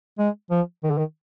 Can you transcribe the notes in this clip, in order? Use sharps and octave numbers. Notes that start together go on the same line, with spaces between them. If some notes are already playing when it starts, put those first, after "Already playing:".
G#3
F3
D#3
D3
D#3